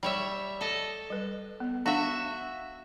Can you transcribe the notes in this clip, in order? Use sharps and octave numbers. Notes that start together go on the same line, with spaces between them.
G3 C#5 E5
A4 D#5
G3 B4
B3
D4 F#4 E5 F5